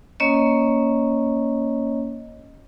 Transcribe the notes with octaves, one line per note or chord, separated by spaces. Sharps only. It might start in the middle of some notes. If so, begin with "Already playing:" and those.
A#3 C#4 C#5 D#5